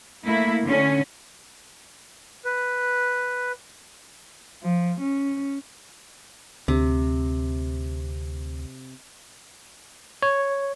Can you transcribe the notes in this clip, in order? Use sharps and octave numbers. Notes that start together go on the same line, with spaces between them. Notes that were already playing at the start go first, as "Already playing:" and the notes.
A3 A#3 E4
D3 C#4
B4
F3
C#4
D2 C3
C#5